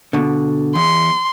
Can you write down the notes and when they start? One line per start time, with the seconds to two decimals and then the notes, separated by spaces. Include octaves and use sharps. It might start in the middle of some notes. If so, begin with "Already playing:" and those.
0.13 B2 D3
0.75 E2 C6